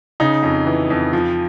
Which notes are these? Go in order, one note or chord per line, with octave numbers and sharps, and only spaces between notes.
C#3 D#4
F2
E3
F2
F3